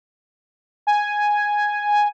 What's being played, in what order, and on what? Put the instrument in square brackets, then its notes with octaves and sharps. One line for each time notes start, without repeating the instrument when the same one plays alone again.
[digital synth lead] G#5